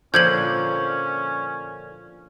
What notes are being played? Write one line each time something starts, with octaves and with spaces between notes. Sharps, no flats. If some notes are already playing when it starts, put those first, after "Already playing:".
A#2 D3 F3 C#4 G6 G#6 F#7